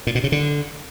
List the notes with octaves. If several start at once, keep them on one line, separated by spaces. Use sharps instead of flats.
A#2
B2
C#3
D3